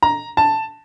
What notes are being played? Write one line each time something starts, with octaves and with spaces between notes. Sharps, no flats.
A#5
A5